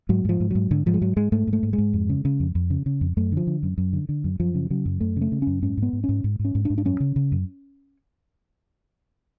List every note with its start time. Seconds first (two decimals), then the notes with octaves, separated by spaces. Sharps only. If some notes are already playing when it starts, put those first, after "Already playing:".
0.09 G#2 F#3
0.25 G#2 F3
0.40 G#2
0.51 G#2 F#3
0.71 G#2 D3
0.86 G#2 F3
0.94 G#3
1.01 G#2 F#3
1.17 G#2 G#3
1.32 G#2 A3
1.47 G#2
1.53 A3
1.63 G#2
1.73 G#3
1.78 G#2
1.93 F2
2.09 C#3
2.25 C#3
2.40 F2
2.55 F2
2.70 C#3
2.86 C#3
3.01 F2
3.17 F#2 A3
3.32 D3 F3
3.47 D3
3.63 F#2
3.78 F#2
3.93 D3
4.09 D3
4.24 F#2
4.40 F#2 F3
4.55 C#3
4.70 C#3 F#3
4.85 F#2
5.00 F#2 A3
5.16 C#3 A3
5.32 C#3
5.42 F#2 C#4
5.62 G#2 C#4
5.77 G#2 B3
5.93 G#2
6.04 C#4
6.09 G#2
6.24 G#2
6.39 G#2
6.45 C#4
6.55 G#2
6.65 D4
6.70 G#2
6.78 D4
6.85 F#2 C#4
7.00 C#3
7.16 C#3
7.32 F#2